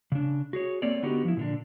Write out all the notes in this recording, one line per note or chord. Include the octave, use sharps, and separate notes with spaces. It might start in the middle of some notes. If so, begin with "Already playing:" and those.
C#3 D4
F#4 G#4 C#5
A3 A#3 C4 C#5 D5
D3 B3 D#4 F#4 G4
F3 E4
A#2 D3 D4